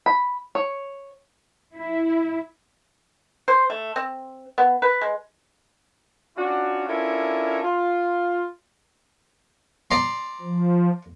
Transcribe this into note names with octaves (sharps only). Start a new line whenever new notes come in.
B5
C#5
E4
C5
A3
C4
B3
B4
G#3
C#4 D4 F4 F#4
C#4 D4 E4 F4 A4 A#4
F4
D5 A#5 C6
F3